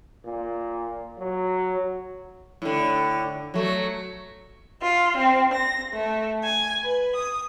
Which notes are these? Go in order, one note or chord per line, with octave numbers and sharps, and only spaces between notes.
A#2
F#3
A2 D3
F#3 A3
F4
C4
A#6
A3
G#5
B4
D#6